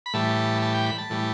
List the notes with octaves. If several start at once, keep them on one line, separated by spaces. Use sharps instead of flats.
B5
A2 E3 G3 A5
A5
G5
B5
A5
A2 E3 G3